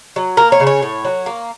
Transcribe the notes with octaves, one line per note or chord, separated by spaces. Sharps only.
F#3
A#3 A#4
C#5
C#3
C#5
A2
F#3
A#3